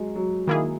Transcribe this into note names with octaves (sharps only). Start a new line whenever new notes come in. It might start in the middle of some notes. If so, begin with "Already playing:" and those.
Already playing: F#3 G#3
F#3
D#3 A#3 E4 G#4